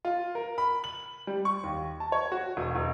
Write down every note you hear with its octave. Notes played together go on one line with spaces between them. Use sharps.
F4
A#4
B5
F#7
G3
C#6
D#2
A5
C#5
F#4
E1
E1